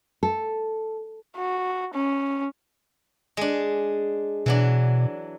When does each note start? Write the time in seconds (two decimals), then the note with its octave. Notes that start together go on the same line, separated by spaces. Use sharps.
0.23 A4
1.36 F#4
1.93 C#4
3.37 G#3 D4
4.46 B2 E3 F#3 D4